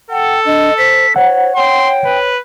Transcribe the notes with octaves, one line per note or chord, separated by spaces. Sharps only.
A4 F#5 G5
D4 D#5
C5 B6
C5 C#5 F#5
C#5 G5 C6
B4